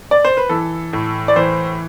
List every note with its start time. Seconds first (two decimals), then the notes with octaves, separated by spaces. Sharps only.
0.11 D5
0.25 C5
0.37 B4
0.49 E3 A4
0.93 A2
1.28 D5
1.36 E3 C5